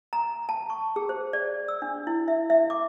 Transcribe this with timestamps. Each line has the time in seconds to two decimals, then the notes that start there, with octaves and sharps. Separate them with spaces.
0.13 A#5
0.49 A5
0.70 C#6
0.96 G#4
1.09 C5
1.33 D5
1.68 E6
1.82 D4
2.07 E4
2.28 E5
2.50 E5
2.70 D6